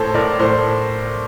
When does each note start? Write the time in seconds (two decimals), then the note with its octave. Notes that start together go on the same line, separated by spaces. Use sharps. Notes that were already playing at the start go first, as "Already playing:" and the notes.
Already playing: A2 A4 C5
0.14 A2 A#4 D5
0.39 A2 A4 C5